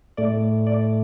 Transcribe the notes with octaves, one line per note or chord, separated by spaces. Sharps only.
A2 A3 D5
D5